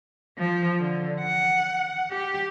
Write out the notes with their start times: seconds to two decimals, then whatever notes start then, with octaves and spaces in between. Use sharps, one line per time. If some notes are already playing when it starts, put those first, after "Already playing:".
0.39 F3
0.80 D3
1.21 F#5
2.11 G4